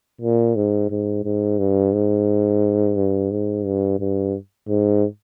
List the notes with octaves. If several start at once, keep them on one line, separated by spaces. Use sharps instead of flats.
A#2
G#2
G#2
G#2
G2
G#2
G2
G#2
G2
G2
G#2